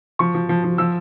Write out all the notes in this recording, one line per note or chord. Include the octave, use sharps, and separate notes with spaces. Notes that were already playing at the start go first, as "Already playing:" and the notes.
F3 C#6
F3
F3
F3
F3 E6